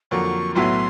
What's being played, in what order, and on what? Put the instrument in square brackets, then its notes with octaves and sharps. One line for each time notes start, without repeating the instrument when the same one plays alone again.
[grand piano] F2 D3 F#3 A#3 [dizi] C#6
[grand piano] B1 A2 F#3 B3 E4 [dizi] C6